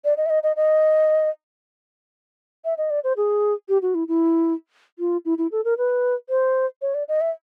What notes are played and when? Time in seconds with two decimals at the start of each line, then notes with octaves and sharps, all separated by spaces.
0.05 D5
0.17 D#5
0.26 E5
0.30 D#5
0.43 D#5
0.56 D#5
2.65 E5
2.78 D#5
2.90 D5
3.04 C5
3.17 G#4
3.69 G4
3.82 F#4
3.95 E4
4.08 E4
4.99 F4
5.25 E4
5.38 E4
5.52 A4
5.65 A#4
5.78 B4
6.29 C5
6.82 C#5
6.94 D5
7.08 D#5
7.21 E5